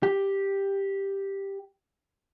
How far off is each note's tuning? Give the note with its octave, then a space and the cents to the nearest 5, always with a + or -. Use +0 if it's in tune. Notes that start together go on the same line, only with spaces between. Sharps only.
G4 +5